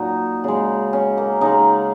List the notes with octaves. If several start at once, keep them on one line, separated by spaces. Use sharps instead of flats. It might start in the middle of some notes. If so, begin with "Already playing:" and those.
Already playing: A#2 F#3 D#4 F#4
C#3 G#3
C#4
A#3
C#3 G#3 D#4